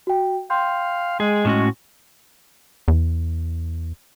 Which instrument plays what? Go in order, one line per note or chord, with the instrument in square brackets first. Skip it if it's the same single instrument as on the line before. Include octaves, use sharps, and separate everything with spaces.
[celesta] F#4 G5
[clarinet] F5 [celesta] G5 C6 G6
[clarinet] G#3 [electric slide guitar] G#4
[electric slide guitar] A2 C#4 F#4
[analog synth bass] E2